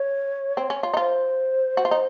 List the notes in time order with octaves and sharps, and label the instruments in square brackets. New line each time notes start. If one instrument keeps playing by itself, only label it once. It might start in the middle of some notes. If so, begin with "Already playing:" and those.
Already playing: [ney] C#5
[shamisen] C4
C#4
F4
D#4
[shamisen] F4 [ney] C5
[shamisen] F#4
F4
D#4